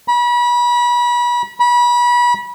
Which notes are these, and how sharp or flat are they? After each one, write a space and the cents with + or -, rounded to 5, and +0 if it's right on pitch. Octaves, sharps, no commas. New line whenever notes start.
B5 -35
B5 -30